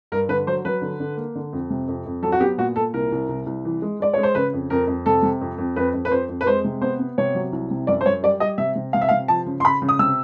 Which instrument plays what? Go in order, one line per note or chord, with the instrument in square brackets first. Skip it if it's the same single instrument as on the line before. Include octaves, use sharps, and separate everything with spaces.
[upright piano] G2 A#4
D3 B4
F#3 C5
F#3 B4
D3
D3
A#3
D3
F2
C3
F2
F2
F#3 A4
F#4
B3 G4
A#2 F#4
A#2 A4
C2 A#4
C2
C2
C2
E3
G#3
G#3 D5
G#3 C#5
C5
C#3 B4
F2
F2 A#4
F2
C3 A4
C3
F2
F2
F2 B4
F2
B4
F2 C5
F2
B4
G#3 C5
C3
B3 C5
B3
C3 C#5
F#3
C2
C3
F#2 D5
C5
F#2 C#5
G3 D5
G3 D#5
C3 E5
C3
C3 F5
E5
F5
C3
F3 A5
C#3
C6
C#3 B5
C#3
D#6
C3 E6